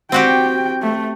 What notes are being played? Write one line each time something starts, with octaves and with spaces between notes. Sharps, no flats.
C4 F#4 G4 G5
A3